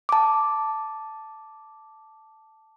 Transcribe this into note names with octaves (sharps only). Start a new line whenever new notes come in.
A5 D6